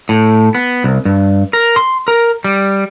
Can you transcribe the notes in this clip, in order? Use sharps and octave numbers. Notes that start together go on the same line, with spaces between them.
A2
B3
C2
G2
A#4
C6
A#4
G3